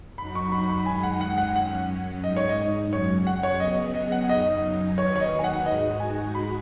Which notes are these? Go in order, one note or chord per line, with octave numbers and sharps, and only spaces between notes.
F#2 F#3 D#4 F#4 B5
C#6
B5
B5
F#2 D#3 G#3 D#4 G#5
F#5
F#5
F#5
F#2 F#3 C#4 F#5
G#2 G#3 D#4 D#5
C#5
D#5
F#2 C#3 F#3 C#4 C#5
F#5
C#5
C#3 F#3 B3 G#4 D#5
D#5
F#5
F#2 C#3 F#3 D#4 D#5
D#2 D#3 F#3 D#4 B4 C#5
C#5
D#5
G#5
F#5
G#2 G#3 D#4 F#4 D#5
G#5
B5